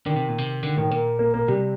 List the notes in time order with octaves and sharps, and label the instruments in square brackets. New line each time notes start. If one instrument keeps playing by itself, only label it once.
[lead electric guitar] D3 [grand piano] D#3
[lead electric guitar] C3
A#2
C3
[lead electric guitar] D3 [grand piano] D#3
[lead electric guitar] A2 [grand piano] D#3
[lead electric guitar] A#2 [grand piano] A#3
[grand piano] A#3
A#3
[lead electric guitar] C3 [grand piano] G3